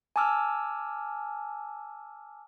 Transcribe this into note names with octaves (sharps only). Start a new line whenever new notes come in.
G#5 A5 D6 E6 F6